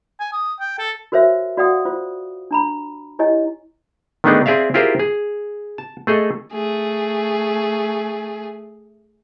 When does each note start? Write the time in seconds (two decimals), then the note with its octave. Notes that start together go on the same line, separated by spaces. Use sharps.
0.20 G#5
0.33 D#6
0.60 G5
0.79 A4
1.12 F#4 A#4 C5 C#5 E5
1.57 F#4 D5 F5 F#5 D#6
1.85 F4 C5
2.51 D4 A#5 B5
3.19 E4 G4 C#5 D#5 G#5
4.24 D#3 A3 B3 D4 D#4 G#4
4.46 C4 G#4 D5 E5 F5
4.74 E4 F4 G4 G#4 A#4 C5
4.99 G#4
5.78 A5
6.07 A3 G#4 A4 D#5
6.53 A3 G#4